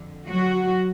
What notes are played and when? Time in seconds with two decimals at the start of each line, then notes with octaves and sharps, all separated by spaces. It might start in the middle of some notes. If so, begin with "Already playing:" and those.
Already playing: F2 D3
0.28 F#3 F#4